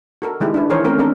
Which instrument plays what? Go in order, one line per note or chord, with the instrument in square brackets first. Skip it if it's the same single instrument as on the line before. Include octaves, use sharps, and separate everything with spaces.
[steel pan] F#4 A4 A#4
D#3 G#3 E4 G4
D4 E4 B4
D#3 E3 G#4 A#4 C5 C#5
A3 C4 C#4 A#4 C5
G#3 C4 D4 A4 A#4